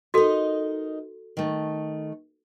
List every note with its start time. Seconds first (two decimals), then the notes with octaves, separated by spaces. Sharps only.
0.14 D#4 F#4 A4 A#4 D#5
1.37 D#3 A3